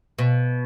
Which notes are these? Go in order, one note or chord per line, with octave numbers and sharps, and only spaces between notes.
B2